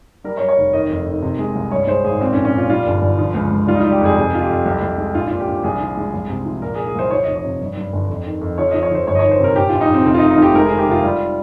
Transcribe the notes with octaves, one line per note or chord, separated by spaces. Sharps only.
G3 A#4
C#5
G3
C#5
F1
D#3 D#5
F2
D#3
C3
G#3
C2
G2 C#5
G#3 C5
G#1 G#4
A#2 C4
C#4
A#1
C#4
A#2 F4
G3 F4
G1
G1
F3
C#2
C#2
G3 F4
D#4
G3 F4
G4
F2 G#4
C3 G#4
C3 F4
G4
F2
C2
C2
G#3
A#1 F4
A#2 F4
G4
A#1
C2 G#4
F3
G#3
C2
C3
F3
A#2 A#4
G#4
A#2
G#4
C2 C5
F3 C#5
F1 D#5
C#5
C3
G2
G2
G1
F2
D#3
F2
F3 C#5
F3 D#5
C#5
F3 C5
G1 C#5
D#5
D#3 C#5
C5
C3 A#4
A#1 G4
A#1 F4
D#4
A#1 C4
F1 C4
F4
F1 D#4
D#4
F1 F4 G4
G#3 A#4
G#4
D#3
G4
F1 F4
G3 F4